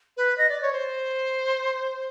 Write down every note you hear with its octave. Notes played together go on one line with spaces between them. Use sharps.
B4
D#5
D5
C#5
C5